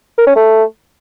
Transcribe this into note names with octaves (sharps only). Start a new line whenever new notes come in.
A#4
C#4
A3